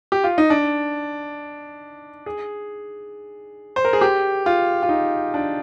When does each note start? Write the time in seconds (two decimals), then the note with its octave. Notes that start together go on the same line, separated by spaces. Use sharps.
0.12 G4
0.24 F4
0.38 D#4
0.50 D4
2.26 G#4
3.76 C5
3.85 A#4
3.93 G#4
4.01 G4
4.46 F4
4.83 F4
4.89 D#4
5.34 D4